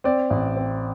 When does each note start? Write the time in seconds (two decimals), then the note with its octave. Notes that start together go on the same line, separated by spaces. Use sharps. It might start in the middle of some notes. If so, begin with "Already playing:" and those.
0.04 C4 D5
0.30 A1
0.56 C4